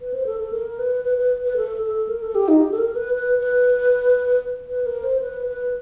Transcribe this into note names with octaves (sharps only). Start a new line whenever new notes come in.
B4
C5
A4
A4
A#4
B4
B4
B4
B4
A4
A4
A#4
A4
G4
D#4
G4
A4
A#4
B4
B4
B4
B4
A#4
C5
B4
B4